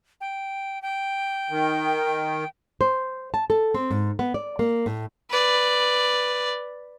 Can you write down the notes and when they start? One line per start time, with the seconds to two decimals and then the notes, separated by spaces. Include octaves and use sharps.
0.21 G5
0.82 G5
1.50 D#3
2.81 C5
3.34 A5
3.50 A4
3.74 C4
3.91 G#2
4.19 B3
4.34 D5
4.59 A#3
4.86 A2
5.30 B4 D5